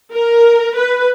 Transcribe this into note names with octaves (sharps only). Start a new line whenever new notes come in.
A#4
B4